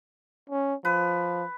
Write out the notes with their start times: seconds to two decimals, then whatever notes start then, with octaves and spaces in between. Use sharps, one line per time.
0.50 C#4
0.85 F3 B4